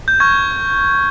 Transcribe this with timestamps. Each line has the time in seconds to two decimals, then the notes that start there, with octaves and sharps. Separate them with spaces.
0.08 G6
0.20 C#6 F6 G#6